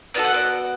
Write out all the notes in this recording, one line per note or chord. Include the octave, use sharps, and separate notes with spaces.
B3 F#4 A4 D5
F#5
D5